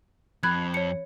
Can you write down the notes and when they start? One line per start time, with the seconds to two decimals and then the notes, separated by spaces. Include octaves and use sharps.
0.43 F2 B5 F#6 G#6
0.74 C#5 C#7